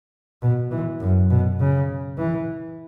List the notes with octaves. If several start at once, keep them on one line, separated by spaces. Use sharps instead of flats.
B2
E3
F#2
B2
C#3
E3